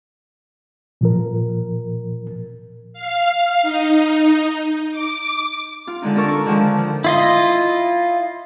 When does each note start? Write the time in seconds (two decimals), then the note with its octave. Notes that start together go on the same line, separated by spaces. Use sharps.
1.01 A#2 F3 A#4
2.93 F5
3.62 D#4
4.91 D6
5.87 F4
6.02 D3 G#3 D#4
6.16 D4 A4 A#4 C#6
6.28 C#6
6.46 D3 D#3 F3 G#3
6.78 F3
7.04 E4 F4 D#5